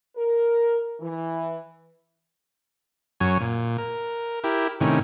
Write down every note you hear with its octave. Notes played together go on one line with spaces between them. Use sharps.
A#4
E3
F#2 F#3 C#5 G#5
A#2
A#4
E4 G4 A#4
A2 C3 D#3 C#4